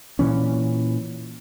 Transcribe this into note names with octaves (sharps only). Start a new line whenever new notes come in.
A#2 E3 C#4